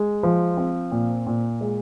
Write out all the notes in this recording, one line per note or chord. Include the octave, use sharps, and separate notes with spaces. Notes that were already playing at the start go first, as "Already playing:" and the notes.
Already playing: G#3
F3
C4
A#2
A#2
G#3